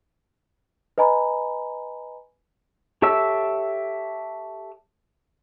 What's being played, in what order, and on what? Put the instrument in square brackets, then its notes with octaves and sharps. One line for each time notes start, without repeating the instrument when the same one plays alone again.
[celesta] B4 D#5 G#5 A#5 B5
[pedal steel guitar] G4 A4 C#5 E5 E6